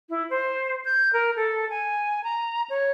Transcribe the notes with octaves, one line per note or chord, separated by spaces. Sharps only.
E4
C5
G6
A#4
A4
G#5
A#5
C#5